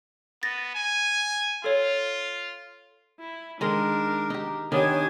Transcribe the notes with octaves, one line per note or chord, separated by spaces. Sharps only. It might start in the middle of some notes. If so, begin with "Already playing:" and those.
B3 A6 A#6
G#5
F4 A4 C#5
E4
D#3 G#3 D4 A#4
D#4 G4
D#3 B3 D4 G4 C#5 G#5 D#6